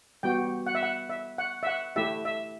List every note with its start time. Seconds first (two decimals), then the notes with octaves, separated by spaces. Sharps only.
0.23 G3 B3 F#4 G5
0.67 F#5
0.75 E5
0.83 F#5
1.10 E5
1.38 F#5
1.63 E5
1.67 F#5
1.96 A3 E4 G4 E5
2.25 E5